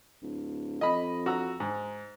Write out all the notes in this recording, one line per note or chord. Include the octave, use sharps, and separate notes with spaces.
D1
F2 D#5 B5
F#4 A#5 E6
G#2